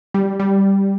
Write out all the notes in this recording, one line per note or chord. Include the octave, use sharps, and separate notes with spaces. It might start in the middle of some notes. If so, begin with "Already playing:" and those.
G3
G3